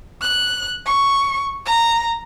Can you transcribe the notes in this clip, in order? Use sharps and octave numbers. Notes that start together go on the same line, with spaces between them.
F#6
C#6
A#5